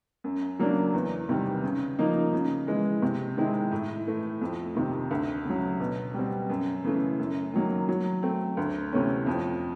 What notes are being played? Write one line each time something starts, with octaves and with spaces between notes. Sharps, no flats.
F#2
C#3 F#3 A#3 D4
E2
C3 D#3 G3
C#3
F3 A#3 D#4
C#3
E3 G#3
C3
D#3 G#3 C4 E4
A2
E3 A3
F2
C3 D#3
D2
C#3 F#3
B2
G3 C4
F#2
C#3 E3 A3
F#2
D#3 F#3 A#3
F#3
A3 C4
D2
C3 E3 A3 C#4
F2